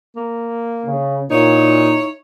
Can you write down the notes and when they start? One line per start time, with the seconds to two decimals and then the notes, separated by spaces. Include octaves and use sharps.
0.16 A#3
0.86 C#3
1.31 A#2 D#4 E4 C#5